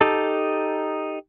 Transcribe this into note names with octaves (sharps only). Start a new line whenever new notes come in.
D#4 G4 A4 A5